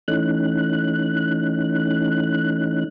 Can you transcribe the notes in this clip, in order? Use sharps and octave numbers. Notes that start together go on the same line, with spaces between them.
E3 A3 C#4 D#4 F#6